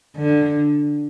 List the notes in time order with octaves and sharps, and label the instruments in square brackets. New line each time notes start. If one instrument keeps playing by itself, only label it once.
[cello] D3